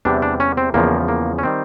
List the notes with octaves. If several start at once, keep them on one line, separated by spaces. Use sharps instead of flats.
E2 C3 E3 G3 D4
D4
C#4
C4
E2 C#3 F3 A#3
A#3
C#4
D#3 G3 C4